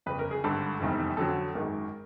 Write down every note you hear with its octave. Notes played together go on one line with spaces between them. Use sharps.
G1 F2 C#3 B4
A#4
G#4
G#1 G2 D3 A4
F1 E2 C3 D#3 G3
F2 D3 F#3 A4
G#1 F#2 D#3 G#3 A#4